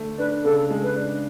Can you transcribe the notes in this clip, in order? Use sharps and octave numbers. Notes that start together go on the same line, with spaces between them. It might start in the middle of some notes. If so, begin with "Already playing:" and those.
Already playing: D3 A3
D4 B4
C#3 A4
G#3
B4
D4